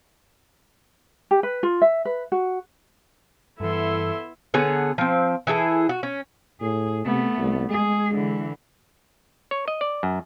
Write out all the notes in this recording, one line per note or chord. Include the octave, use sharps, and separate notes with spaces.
G4
B4
F4
E5
B4
F#4
G2 E3 B3 E4 A4 E5 C6
D3 B3 G#4 C#5
F3 C4
E3 E4 G#4 A4
F#4
C#4
A2 G#4
C3 A3 B3
C2
G#3 G#4
D3 E3
C#5
D#5
D5
F#2